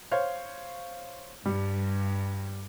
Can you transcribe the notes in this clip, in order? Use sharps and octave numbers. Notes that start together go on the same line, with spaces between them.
C5 C#5 F5
G2 G3